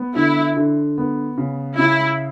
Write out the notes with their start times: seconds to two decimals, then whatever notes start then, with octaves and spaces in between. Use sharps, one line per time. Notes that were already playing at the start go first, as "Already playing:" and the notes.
Already playing: B3
0.16 D3 E4
0.57 D3
0.98 B3
1.38 C#3
1.78 C#3 E4